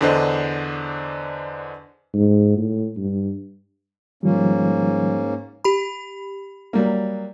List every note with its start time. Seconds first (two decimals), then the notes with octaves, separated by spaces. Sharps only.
0.01 E2 D3 D4 C5 D#5
2.14 G#2
2.57 A2
2.97 G2
4.23 G#2 D#3 F3 G3 A#3 C#4
5.64 G4 B5
6.73 F#3 G3 A#3